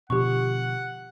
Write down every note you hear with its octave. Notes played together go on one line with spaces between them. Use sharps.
B2 D3 F3 G4 F#5 C#6